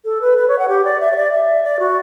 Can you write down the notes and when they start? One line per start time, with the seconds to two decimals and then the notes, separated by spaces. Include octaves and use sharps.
0.05 A4
0.21 B4
0.38 B4
0.48 C#5
0.59 F#5
0.68 G4
0.85 D5
1.00 E5
1.12 C#5
1.16 D5
1.32 E5
1.63 D5
1.80 F#4